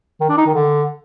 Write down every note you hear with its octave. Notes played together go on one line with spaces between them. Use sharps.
D#3
D4
D#4
D#3
D3